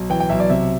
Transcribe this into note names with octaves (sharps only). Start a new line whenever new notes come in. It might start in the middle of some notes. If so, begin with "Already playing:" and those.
Already playing: B1
E3 G5
G5
B1 E5
D5
C3 E5